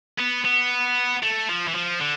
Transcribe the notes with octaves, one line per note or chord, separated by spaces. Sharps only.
B3
B3
A3
F3
E3
F3
D3